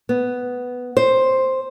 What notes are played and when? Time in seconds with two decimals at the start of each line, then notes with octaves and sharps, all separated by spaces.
0.09 B3
0.97 C5